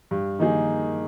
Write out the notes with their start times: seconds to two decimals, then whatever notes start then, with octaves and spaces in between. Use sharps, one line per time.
0.11 G2
0.39 D#3 A#3 D#4 G#4